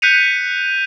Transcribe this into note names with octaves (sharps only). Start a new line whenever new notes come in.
F#6 G6 B6 C#7 D#7 F7